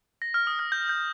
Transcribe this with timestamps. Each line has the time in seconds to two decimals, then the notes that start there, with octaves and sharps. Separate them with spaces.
0.22 A#6
0.34 F6
0.47 D#6
0.59 F6
0.72 G6
0.89 G6